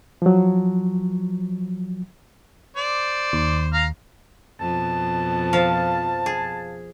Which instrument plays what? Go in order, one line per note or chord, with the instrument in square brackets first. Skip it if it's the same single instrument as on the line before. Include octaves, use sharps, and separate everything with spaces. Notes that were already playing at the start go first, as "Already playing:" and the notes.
[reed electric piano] F3 F#3
[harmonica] C5 D5
[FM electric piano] D#2
[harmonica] F5 A#5 F6
[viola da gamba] F2 B2 [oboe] A5
[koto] F3 F5
G#4